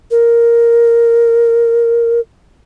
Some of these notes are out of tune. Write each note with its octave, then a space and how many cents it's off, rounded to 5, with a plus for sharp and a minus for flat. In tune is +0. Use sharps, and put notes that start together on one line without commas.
A#4 +0